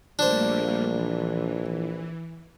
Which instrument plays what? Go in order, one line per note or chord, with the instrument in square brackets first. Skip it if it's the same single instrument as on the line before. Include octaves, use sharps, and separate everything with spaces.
[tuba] A#1 [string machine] G3 A3 A#3 [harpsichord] D4 C5
[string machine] E3